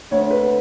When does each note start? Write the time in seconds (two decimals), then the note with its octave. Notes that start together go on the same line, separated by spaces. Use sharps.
0.11 D2 D3 C#5
0.31 B4